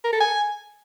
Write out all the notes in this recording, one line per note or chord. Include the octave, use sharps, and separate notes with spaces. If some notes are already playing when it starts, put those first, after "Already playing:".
A#4
A4
G#5